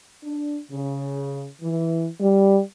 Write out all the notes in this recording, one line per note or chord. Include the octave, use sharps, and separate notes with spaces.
D4
C#3
E3
G3